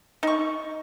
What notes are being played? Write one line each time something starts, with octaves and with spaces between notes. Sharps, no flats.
D#4 C#6